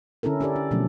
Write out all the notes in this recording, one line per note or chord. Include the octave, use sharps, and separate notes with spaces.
D3 C#4 E4 A4 A#4
D4 G4 A4 A#4 D5
D4
B2 D3 F3 F#3 A3 C#4